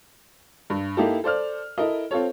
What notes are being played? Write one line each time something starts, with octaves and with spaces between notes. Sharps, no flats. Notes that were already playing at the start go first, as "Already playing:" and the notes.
G2
A#3 D#4 E4 G4 A4
A4 C5 D5 F6
E4 A4 A#4 D#5
C4 F4 A4 C#5